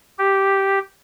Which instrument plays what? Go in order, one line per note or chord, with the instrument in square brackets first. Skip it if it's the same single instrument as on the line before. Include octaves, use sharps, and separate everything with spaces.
[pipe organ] G4